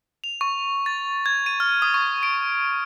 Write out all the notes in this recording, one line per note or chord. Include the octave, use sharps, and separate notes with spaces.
F7
C#6
A6
G#6
D#7
F6
D#6
C#6
D7